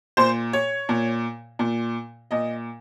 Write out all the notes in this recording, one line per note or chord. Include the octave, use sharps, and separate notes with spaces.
A#2 C5
C#5
A#2
A#2
A#2 D#5